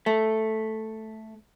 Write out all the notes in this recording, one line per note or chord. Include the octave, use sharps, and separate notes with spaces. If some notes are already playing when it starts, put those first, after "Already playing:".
A3